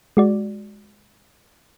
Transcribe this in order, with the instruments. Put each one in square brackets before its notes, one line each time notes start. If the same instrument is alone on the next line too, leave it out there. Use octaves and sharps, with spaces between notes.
[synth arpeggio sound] G#3 F#4 D5